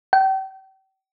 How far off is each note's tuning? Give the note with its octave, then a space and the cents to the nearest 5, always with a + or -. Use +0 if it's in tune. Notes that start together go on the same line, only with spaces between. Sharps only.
G5 -40